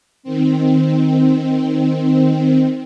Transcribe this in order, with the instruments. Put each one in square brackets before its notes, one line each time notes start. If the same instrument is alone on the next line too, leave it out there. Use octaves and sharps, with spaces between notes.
[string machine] D#3 C4